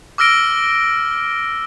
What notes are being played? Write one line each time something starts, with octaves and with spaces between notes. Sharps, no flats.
D6 E6 F6 A#6 D7 G7